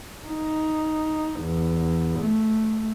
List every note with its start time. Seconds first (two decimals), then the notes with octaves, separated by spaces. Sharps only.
0.27 D#4
1.41 E2
2.20 A3